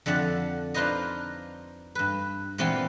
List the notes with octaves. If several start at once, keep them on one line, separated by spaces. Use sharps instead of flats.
F2 D3 E5 F#5 A5
D4 D#4 F4 B4 C5 D#5
G2 B4
A#2 E3 B3 C4 E4 F4